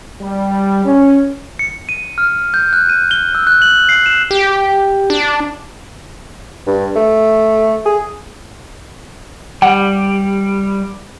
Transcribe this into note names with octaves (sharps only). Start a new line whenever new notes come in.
G3
C#4
C#7
D#7
F6
G6
F#6
D#7
G7
E6
F#6
F#7
C7
E7
G4
D4
G2
A3
G#4
G3 F#5